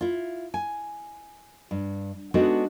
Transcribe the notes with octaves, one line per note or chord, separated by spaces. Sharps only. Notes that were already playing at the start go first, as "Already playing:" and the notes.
E4 F4
G#5
G2
G#3 B3 D4 D#4 F#4 A4